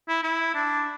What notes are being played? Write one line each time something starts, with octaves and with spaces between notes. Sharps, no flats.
E4
E4
D4